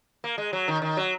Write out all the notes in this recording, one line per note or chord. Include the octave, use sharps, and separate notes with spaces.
A#3
G#3
F#3
D#3
D#3
F#3